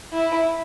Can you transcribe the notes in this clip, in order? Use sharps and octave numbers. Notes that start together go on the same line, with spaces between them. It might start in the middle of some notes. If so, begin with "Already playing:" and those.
E4